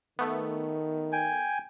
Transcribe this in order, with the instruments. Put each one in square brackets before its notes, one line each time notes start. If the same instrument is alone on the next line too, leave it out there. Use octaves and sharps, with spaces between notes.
[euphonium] D#3 [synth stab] A3 B3
[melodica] G5 G#5